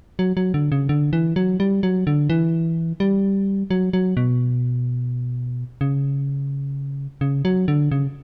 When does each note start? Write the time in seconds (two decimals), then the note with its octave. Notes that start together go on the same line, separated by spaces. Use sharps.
0.19 F#3
0.37 F#3
0.54 D3
0.72 C#3
0.89 D3
1.13 E3
1.36 F#3
1.60 G3
1.83 F#3
2.07 D3
2.30 E3
3.00 G3
3.70 F#3
3.93 F#3
4.17 B2
5.81 C#3
7.21 C#3
7.45 F#3
7.68 D3
7.91 C#3